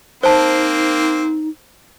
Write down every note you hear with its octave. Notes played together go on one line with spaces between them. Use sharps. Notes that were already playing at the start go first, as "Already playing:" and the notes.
A#3 C4 D#4 C5 A5